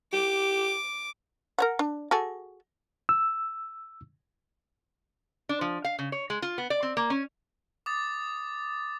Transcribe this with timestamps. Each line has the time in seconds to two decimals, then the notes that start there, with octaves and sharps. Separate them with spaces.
0.13 G4 D6
1.58 A#4 C#5 F#5
1.79 D4
2.11 F#4 G#4 A4
3.09 E6
5.49 D4
5.61 F3
5.84 F5
5.99 C#3
6.12 C#5
6.30 G#3
6.42 F4
6.58 B3
6.70 D5
6.83 C4
6.97 A#3
7.10 C#4
7.86 D6 D#6 A6